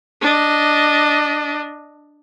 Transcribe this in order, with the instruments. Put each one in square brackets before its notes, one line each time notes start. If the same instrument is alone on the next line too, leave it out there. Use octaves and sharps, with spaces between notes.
[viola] D4 D#5